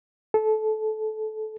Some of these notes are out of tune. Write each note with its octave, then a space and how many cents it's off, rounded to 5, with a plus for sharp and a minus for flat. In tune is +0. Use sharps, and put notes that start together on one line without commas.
A4 -20